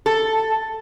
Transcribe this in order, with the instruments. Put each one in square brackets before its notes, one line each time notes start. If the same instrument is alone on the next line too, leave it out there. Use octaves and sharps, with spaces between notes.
[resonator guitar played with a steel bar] A4